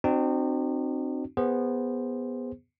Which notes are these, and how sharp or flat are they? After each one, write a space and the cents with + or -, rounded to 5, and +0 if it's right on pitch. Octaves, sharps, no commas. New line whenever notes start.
C4 +0 D#4 -45 F#4 +10
B3 -5 G#4 -25 C5 +0